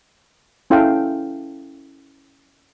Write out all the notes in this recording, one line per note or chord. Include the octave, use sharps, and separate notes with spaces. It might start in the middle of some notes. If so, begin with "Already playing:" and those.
C#4 E4 A4 F5 G5